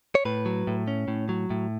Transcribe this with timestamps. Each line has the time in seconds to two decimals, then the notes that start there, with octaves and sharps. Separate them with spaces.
0.15 C#5
0.25 A2 B4
0.46 F#3
0.67 A2
0.87 C#4
1.08 A2
1.29 F#3
1.50 A2